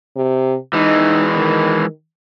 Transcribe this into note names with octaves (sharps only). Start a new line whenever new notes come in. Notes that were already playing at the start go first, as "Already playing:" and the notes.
C3
E3 G#3 D#4
D#3